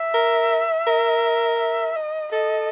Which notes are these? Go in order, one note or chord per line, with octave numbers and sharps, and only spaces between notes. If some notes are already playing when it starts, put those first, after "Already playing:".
Already playing: E5
A#4
A#4
E5
D#5
A4 D#5